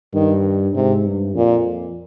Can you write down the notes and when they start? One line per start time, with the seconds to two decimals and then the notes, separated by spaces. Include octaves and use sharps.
0.13 G2 D#3
0.75 G#2 C3
1.06 G2
1.36 F2 A#2